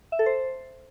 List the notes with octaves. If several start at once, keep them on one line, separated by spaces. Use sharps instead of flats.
E5
A4
C5